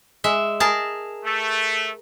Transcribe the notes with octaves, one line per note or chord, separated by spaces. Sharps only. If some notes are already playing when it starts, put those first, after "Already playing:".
G#3 E5
G#4 A#4 A5
A3